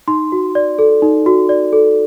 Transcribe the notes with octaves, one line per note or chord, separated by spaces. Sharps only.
D#4 C6
F#4
D5
A4
D#4
F#4
D5
A4